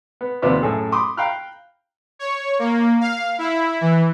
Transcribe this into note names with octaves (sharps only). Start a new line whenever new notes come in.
B3
D#2 C3 F3 B3 D5 E5
F#2 A2 G#4 A4
B5 C6 D6 D#6
F5 G5 A#5 B5 F6 F#6
C#5
A#3
F5
E4
E3